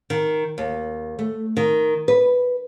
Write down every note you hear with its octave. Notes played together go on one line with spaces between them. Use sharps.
D#3
D#2
A3
D#3
B4